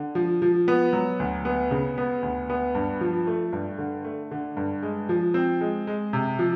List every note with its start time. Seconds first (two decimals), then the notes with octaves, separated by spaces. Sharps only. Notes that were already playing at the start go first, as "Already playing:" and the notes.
Already playing: D3
0.15 F3
0.42 F3
0.68 B3
0.93 F#3
1.20 D2
1.45 B3
1.71 C#3
1.98 B3
2.22 D2
2.50 B3
2.75 G2
3.01 F3
3.27 A3
3.52 G2
3.78 D3
4.04 A3
4.31 D3
4.57 G2
4.82 G#3
5.09 F3
5.34 C4
5.61 G#3
5.87 G#3
6.13 C3
6.39 F3